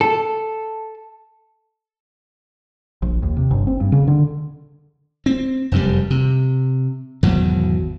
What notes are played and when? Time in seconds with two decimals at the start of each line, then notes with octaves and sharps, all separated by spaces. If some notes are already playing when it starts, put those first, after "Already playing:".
0.01 A4
3.02 A#1
3.23 D#2
3.37 C3
3.51 G1
3.67 C4
3.80 G2
3.92 C#3
4.07 D3
5.26 C4
5.72 F1 F#2 A2 G3
6.10 C3
7.23 G#1 E2 B2 F#3